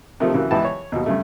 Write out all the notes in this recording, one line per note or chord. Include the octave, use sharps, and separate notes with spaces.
C3 D#3 F3 A3
C#3 E3 F#3 A#3
C#2 E3 B3 B4 G5 A5
C#5
D#2 B2
G2 C#3 A3